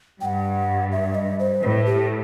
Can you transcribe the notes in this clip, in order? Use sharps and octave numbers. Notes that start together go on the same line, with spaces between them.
G2 F#5 G5
E5
D#5
C5
A2 B4
G4